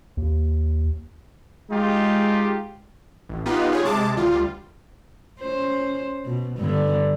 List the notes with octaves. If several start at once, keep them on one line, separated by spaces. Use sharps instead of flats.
D#2
G#3 D#4 F4 G4
A1
B3 D#4 F4 G4 B4
F4 G#4 C#5
C3 G#3 A5 D6
D2 G3 F4
C#4 C5
B2
G2 D3 B3